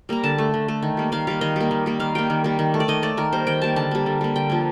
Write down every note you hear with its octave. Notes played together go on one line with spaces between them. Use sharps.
G3 A#3 A#5
D3 A5
A3
D3
A3
D#3
G3 A#3
D#3 F5
G3 A#3 F5
D#3 D#5
G3 A#3
D#3
G3 A#3
D#3 F5
G3 A#3 G5
D#3
G3 A#3
D#3
A3
D5
D#3 D#5
A3 D5
D#3 A#4
G3 A#3 C5
D#3 G5
G3 A#3 A5
D3 A5
G3 A#3
D3
G3 A#3
D3 G5
F3 A#3